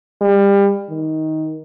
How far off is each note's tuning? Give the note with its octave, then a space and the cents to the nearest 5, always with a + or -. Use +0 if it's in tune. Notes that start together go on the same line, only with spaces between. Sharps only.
G3 +25
D#3 +15